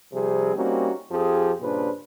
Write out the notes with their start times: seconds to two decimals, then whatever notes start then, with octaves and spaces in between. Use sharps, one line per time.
0.12 C3 F3 G3 C4 G#4
0.56 G3 A#3 C4 C#4 D#4 F#4
1.11 F2 F3 G4 G#4
1.61 G2 A#2 C#3 D4 B4 C5